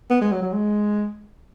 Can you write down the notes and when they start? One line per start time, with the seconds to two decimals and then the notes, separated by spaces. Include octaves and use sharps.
0.10 B3
0.21 G#3
0.32 F#3
0.42 F#3
0.53 G#3